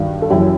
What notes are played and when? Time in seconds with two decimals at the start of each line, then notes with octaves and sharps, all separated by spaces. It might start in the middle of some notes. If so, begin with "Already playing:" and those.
Already playing: G2 D#3 F#4
0.22 A4
0.30 F#2 E3 E4 G4